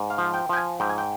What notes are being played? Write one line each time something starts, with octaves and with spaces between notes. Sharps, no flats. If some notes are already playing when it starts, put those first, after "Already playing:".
Already playing: G#2
F5
F3
G5
F3 G5
G#5
G#2 G5
G#5
G5